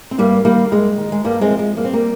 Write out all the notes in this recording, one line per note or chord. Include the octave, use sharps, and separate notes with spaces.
C4
G2 G3 A#3
D#3 G3 A#3
G2 G#3
D#3
G#3
G2 G3 A#3
G#3 C4
F3
G#3
G2 A#3
C4
G3 A#3